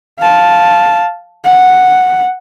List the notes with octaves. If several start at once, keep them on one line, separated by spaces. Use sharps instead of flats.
F5 A5
F#5